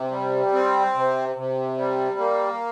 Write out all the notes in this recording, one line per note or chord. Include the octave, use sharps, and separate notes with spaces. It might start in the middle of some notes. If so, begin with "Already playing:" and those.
Already playing: C3
G3
C4
C3
C3
G3
A#3